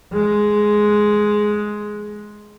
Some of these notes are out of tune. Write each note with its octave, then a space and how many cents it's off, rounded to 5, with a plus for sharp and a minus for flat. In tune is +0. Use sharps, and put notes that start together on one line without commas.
G#3 +5